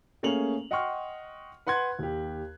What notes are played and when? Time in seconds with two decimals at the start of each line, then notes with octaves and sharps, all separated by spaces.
0.23 A3 A#3 C#4 G#4 F7 F#7
0.71 D#5 F#5 G5 C6 C#6 F6
1.67 B4 F#5 C6 F#6 G#6
1.99 D#2 G4